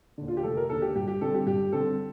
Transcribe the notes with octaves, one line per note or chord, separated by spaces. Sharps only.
D#2 D3
F4
G4
F1 A4
A#4
D#2 D3 A4
G4
G2 G4
G4
D3 G3 C4 A4
G4
G2 G4
D3 G3 C4 A4